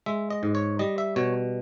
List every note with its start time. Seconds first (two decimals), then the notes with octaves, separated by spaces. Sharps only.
0.06 G#3 E5
0.30 D#5
0.43 G#2
0.55 C#5
0.79 G3 D#5
0.98 E5
1.16 B2 C#5